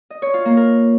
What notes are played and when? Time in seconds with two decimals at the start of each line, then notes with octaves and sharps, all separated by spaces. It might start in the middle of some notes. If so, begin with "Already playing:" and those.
0.10 D#5
0.22 C#5
0.34 F4
0.45 A#3
0.57 A#4